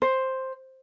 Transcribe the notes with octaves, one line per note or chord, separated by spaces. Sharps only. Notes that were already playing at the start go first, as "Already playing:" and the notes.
C5